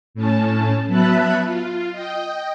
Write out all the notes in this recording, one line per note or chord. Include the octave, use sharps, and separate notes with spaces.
A2 C#4 A5
F#3 B3 E5 A5 B5 F#6
F4
D#5 G5